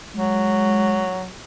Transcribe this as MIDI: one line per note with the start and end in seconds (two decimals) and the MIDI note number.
0.15 1.29 54
0.15 1.07 56